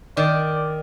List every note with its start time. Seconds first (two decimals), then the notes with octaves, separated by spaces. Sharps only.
0.17 D#3 D5